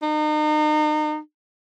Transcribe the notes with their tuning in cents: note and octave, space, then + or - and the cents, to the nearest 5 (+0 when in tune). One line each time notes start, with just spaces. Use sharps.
D#4 -35